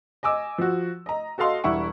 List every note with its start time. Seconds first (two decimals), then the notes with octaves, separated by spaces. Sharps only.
0.23 D#5 G#5 D6 E6
0.58 F3 F#4
1.06 D#5 A#5
1.38 F#4 A4 D#5 F5 C6
1.64 E1 G3 E4 F#5 C#6